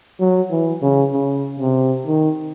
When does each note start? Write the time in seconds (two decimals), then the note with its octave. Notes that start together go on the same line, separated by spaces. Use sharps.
0.20 F#3
0.51 E3
0.82 C#3
1.13 C#3
1.60 C3
2.07 D#3